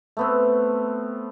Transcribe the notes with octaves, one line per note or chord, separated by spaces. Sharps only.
A3 B3 C4